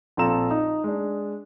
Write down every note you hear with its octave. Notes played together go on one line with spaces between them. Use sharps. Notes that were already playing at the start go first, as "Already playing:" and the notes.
A#1 C4 F4 A4 A#5 E7
D#4
G#3 D4